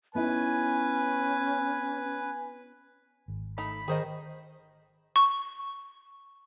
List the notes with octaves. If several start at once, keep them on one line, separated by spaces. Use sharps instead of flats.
B3 C#4 D#4 E4 B4 G#5
G#1
A3 D#4 B5
D#3 G#4 C5 D#5
C#6